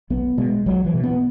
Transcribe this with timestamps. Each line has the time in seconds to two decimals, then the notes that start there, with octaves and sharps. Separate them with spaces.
0.10 B1 B3
0.38 B2 G#3
0.66 B1 F#3
0.85 E3
0.94 B2
1.03 B3